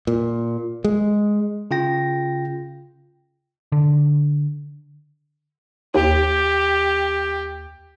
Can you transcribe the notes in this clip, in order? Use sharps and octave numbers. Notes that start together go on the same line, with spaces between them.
A#2
G#3
C#3 F4 G5 A#6
D3
D#2 G4